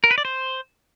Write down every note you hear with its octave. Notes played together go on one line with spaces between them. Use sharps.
A#4
B4
D5
C5